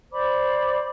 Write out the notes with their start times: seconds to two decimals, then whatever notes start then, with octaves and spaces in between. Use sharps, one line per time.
0.12 C5 D5 B5 D6